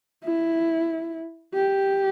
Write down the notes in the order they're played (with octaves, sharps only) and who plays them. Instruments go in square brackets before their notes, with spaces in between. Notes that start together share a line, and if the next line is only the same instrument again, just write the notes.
[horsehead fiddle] E4
G4